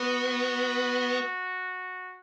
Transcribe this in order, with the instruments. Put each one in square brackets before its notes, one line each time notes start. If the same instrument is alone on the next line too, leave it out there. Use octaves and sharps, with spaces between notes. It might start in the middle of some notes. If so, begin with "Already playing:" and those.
Already playing: [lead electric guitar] B3 [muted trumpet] F#4